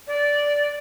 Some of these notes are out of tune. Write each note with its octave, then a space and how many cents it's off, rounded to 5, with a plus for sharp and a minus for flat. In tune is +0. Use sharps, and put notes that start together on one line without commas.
D5 -10